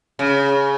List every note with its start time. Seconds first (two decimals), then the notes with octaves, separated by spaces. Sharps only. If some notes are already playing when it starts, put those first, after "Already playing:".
0.19 C#3